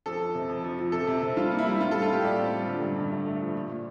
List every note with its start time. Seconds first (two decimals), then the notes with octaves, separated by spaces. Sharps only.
0.06 F2 A4
0.21 F3
0.35 C3
0.49 F2
0.64 F3
0.79 F3
0.92 C3 A4
1.07 C3
1.22 C3
1.36 G3 F4
1.51 A#3
1.59 E4
1.66 G3
1.80 A2 F4
1.91 G3 A4
2.02 F4
2.09 A2 G4
2.24 A2 D5
2.39 C4
2.53 G3
2.67 D3
2.82 G2
2.96 G2
3.12 A3
3.26 A3
3.41 F3
3.54 A#2
3.70 A#2